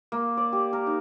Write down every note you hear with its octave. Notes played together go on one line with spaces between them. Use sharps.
A#3
D5
G4
A#4
D#4